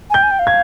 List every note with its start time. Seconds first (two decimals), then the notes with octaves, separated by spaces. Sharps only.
0.10 G#5
0.14 G5 G6
0.23 G#5
0.31 G5
0.39 F5
0.47 G#6